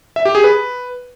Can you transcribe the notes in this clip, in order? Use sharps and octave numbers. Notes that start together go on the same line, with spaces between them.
E5
G4
G#4
B4